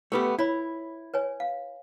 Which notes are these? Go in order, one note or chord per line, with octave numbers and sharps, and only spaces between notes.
A3 B3 F4 G4 B4
E4 F4 C#5 B5
B4 C#5 G#5
F5